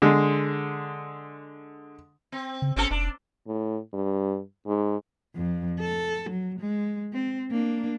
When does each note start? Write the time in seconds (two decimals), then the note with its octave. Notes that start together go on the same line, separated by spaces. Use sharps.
0.02 D3 G#3
2.32 C4
2.62 C#3
2.76 G1 C4 C#4 A4
2.91 F1 D4
3.47 A2
3.93 G2
4.67 G#2
5.35 F2
5.80 A4
6.30 F#3
6.60 G#3
7.13 C4
7.51 A#3 D4